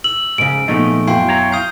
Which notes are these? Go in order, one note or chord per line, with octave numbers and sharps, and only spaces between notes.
E6 F#7
G#2 C#3 D7
A#2 F3 A3 B3 D#4
F#2 B2 E4 F5 G5 C6
C#5 A#5
F5 D#6 G6